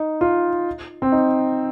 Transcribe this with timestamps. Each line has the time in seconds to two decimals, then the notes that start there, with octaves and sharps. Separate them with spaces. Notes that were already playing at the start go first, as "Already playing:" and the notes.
Already playing: D#4
0.21 F4
1.02 C4
1.12 D#4